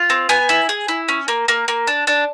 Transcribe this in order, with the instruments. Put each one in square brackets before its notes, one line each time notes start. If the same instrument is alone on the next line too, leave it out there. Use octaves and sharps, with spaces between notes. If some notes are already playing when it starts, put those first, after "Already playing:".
Already playing: [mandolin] F4
C4
B3 G#5
E4
G#4
E4
C#4
A#3
A#3
A#3
D4
D4